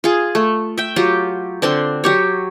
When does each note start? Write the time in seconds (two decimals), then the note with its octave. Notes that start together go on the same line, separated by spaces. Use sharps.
0.04 F4 G#4
0.35 A3
0.78 E5 G5
0.96 F#3 F4 G4
1.62 D3 C4 D4 C6
2.04 F#3 G4 C#5